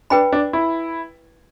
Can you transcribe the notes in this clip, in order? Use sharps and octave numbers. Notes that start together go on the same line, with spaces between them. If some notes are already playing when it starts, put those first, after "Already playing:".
D4 B4 G5 B5
D4
E4